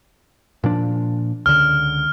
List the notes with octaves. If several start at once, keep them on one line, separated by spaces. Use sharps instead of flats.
A#2 F3 D4
C#2 D3 F6